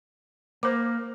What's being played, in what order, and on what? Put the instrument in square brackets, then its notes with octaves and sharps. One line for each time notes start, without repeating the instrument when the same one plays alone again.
[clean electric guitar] A#3 [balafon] C5 D6